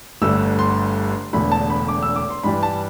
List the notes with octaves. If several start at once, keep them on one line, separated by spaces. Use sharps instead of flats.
G1 G2 D3 A3 E6
C6
E1 E2 D3 A3 B5
A5
B5
D6
E6
D6
C6
G2 E3 G3 D4 B5
A5